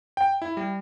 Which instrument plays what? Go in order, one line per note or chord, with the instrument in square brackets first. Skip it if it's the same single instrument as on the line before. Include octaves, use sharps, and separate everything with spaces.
[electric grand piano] G5
E4
G3